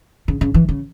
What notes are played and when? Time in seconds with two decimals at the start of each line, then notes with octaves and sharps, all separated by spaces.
0.28 C#3
0.41 C#3
0.54 E3
0.69 C#3